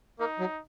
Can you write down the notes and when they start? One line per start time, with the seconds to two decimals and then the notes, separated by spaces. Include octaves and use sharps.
0.19 A#3 D#4
0.39 F#3